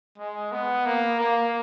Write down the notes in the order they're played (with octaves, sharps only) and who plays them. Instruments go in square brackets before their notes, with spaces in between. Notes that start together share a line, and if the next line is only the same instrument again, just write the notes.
[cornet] G#3
B3
A#3
A#3